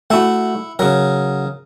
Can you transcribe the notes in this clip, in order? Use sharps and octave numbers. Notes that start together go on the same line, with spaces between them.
A3 E4 F#4 F#5
C#3 F#3 A#4